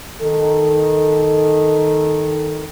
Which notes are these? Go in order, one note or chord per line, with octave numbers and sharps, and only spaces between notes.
D#3 A4